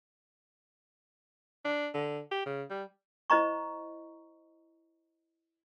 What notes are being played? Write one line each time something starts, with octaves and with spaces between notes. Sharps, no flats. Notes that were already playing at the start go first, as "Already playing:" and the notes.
D4
D3
G4
C#3
G3
E4 C5 D#5 A#5 C#6